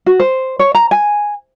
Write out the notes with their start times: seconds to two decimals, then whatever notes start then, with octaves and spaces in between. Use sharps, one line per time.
0.06 F#4
0.20 C5
0.59 C#5
0.75 A#5
0.91 G#5